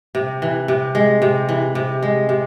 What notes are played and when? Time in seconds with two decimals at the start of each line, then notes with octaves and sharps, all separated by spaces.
0.15 C3
0.42 E3
0.68 C3
0.95 G#3
1.22 C3
1.49 E3
1.75 C3
2.03 G#3
2.29 C3